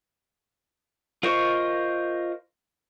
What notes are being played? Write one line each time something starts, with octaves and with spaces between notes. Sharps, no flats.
F4 A#4 C5 D#5 C#6